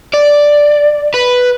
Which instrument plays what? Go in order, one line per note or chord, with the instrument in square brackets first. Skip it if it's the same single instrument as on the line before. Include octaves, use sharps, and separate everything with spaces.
[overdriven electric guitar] D5
B4